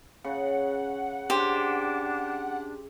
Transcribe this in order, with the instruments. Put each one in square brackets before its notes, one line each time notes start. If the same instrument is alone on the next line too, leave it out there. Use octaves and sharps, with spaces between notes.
[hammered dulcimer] C#3 [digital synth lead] F#5
[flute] D4 [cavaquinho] G4 C5